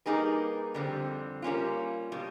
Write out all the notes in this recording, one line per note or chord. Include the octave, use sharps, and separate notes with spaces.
G3 A#3 D#4 G#4 B4
F2 D3 G3 C4
G3 A#3 C#4 F4
B2 G3